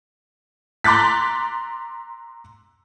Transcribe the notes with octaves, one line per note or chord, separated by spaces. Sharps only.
A#5 C6 D6 F#6 A6 B6